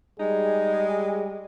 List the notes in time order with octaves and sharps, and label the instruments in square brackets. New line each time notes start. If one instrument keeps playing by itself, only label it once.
[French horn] G3 [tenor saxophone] G#3 [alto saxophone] D#4 [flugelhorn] G#4